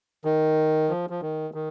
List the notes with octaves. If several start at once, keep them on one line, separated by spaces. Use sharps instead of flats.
D#3
F3
F3
D#3
D#3